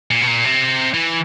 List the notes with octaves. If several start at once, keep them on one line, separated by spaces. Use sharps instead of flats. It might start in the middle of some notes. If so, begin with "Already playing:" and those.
A#2
B2
A#2
C3
E3